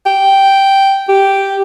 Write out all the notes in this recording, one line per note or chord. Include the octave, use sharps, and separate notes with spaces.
G5
G4